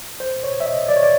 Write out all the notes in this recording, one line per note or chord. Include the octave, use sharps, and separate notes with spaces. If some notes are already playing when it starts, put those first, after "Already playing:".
C5
C#5
E5
D#5
D5
C#5
D5